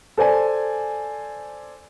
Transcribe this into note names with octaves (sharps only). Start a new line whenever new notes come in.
A4 C5 D5 G#5